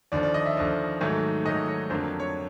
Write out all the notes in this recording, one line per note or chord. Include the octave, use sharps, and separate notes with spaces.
D#2 D3 F3 D5
D5
D#5
E5
D#2 D3 F3
G#2 D#3 F#3 A3
G#2 D#3 F#3 A3 D#5
C#5
F2 D3 F#3 A#3 C5
C#5